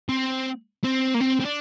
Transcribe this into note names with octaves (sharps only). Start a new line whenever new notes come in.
C4
C4
A#3
C4
C4
D4